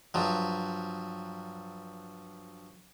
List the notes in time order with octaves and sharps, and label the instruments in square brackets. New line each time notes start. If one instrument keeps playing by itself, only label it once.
[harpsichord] G2 F3 F#3